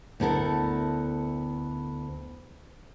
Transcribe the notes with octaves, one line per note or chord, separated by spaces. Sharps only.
D2 B3 E4 A4 A#4